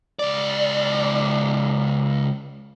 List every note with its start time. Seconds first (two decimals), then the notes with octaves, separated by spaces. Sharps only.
0.19 C#2 D5